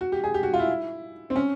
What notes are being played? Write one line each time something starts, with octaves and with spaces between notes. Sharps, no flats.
F#4
G4
G#4
G4
F#4
F4
E4
C4
C#4